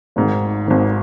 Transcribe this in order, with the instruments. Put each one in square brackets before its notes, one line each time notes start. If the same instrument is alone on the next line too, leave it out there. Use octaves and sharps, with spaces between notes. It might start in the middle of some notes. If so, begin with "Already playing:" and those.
[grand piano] G#1 G#2 D#3
G#1 G#2 D#3